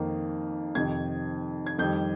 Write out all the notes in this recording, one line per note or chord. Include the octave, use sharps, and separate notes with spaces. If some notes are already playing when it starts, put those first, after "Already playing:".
Already playing: F2 D#3 A#3
F2 C3 D#3 G#6
G#6
F2 D#3 G3 G6